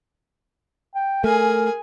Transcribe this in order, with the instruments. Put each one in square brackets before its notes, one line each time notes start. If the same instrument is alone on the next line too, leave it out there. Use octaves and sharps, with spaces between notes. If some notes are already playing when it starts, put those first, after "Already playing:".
[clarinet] G5
[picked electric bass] A3 [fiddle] G#4 G#5 [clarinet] A#4